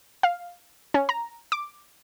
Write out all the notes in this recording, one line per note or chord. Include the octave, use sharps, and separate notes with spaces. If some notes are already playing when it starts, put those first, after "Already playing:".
F5
C#4
A#5
D6